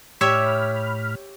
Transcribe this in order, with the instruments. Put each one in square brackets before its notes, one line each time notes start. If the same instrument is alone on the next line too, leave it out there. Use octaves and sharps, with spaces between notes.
[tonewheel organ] A2 B5 F6 [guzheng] G4 C#5 E5